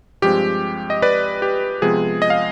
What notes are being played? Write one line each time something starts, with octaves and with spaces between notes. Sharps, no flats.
G2 F3 G#3 C4 G4
D#5
B4 D5
G4
C3 F3 G#3 B3 G#4
D#5
F5